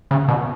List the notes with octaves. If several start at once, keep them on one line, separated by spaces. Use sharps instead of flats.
C#3
B2